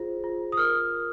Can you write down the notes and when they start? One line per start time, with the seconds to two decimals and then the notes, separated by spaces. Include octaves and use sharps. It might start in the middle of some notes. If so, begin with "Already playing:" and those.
Already playing: F4 G#4 C5
0.24 F4
0.52 D#6
0.57 A#4 F6